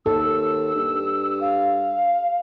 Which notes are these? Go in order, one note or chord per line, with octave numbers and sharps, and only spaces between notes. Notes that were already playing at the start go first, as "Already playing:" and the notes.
D#2 A4 E6
G2
F5